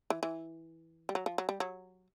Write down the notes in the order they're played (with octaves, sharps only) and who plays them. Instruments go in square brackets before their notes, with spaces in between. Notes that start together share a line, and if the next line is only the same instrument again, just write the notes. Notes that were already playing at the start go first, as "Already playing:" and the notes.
[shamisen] E3
E3
G3
F#3
F3
F#3
G3
F#3